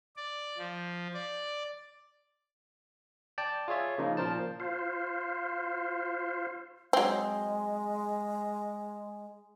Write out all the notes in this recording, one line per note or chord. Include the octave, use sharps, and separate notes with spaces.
D5
F3
D5
D5 G5 A5
F4 G#4 C#5 E5
C#3 F3 A#3 D#4
A#2 F3 A#4 C5 A5
F4 C5
F#3 G#3 C4